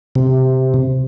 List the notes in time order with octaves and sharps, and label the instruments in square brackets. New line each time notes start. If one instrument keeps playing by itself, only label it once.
[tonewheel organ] C3